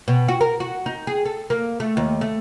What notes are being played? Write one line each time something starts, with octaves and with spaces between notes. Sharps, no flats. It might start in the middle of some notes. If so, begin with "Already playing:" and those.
B2
F#4
A#4
F#4
D#4
G#4
A4
A#3
A3
D#2
A3